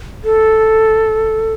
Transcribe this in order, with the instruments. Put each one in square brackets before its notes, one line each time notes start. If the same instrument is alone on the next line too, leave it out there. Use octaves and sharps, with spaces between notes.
[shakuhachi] A4